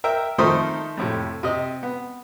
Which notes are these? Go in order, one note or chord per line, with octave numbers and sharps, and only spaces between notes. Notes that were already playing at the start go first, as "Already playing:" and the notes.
A#4 E5 G5
D#3 F3 A3 D#4 C5 D#6
F2 A2 C3
C3 D#5
B3